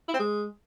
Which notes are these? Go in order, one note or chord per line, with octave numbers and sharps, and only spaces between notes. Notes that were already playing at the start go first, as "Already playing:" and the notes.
E4
C4
G#3